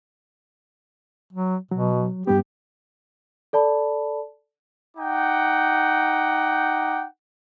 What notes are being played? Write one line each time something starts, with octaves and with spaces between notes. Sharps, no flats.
F#3
B2 F#3
G2 G3 B3 G4
A4 D5 A5 B5
D#4 F#5 G5 D6